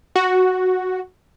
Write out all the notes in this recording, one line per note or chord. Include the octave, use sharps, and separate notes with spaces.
F#4